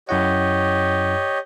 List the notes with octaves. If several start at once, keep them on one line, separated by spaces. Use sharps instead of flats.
F#2 E4 G4 C#5 D#5 F#5